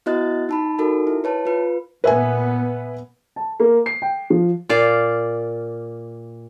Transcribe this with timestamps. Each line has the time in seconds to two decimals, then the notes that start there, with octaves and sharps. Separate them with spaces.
0.06 B3 E4 F#4 D#5 F#6 A6
0.49 D#4 A5 B5
0.79 D#4 F#4 A4 A#4
1.07 E4
1.24 B4 C#5 A5
1.45 F4 B4
2.04 A#2 B3 B4 E5 G#5
3.36 A5
3.60 A#3
3.86 C7
4.02 G5
4.30 F3
4.69 A#2 D5 F5